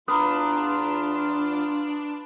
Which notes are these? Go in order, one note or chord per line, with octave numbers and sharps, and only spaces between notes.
E2 D4 F4 B4 A#5 D#6 F6